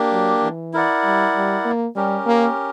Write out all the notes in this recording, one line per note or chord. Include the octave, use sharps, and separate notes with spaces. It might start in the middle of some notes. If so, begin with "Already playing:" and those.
Already playing: A#3 D4 G4
F#3
E3
E4 A#4 D5 F#5
G3
G3
A#3
G3 C#4 G4 A#4
A#3